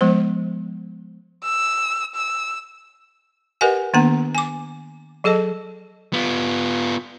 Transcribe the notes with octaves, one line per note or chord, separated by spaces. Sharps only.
F3 G#3 B3 C5
E6
E6
G4 A#4 B4 D#5 F#5 G#5
D#3 A#3 B3 D4 A#5
G#5 D6
F#3 G#4 A4 D#5 A5
B3 F4